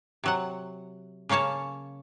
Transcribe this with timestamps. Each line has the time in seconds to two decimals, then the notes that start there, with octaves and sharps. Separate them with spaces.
0.24 C3 F#3 F#5
1.29 C#3 A#3 C#4 C#5 A5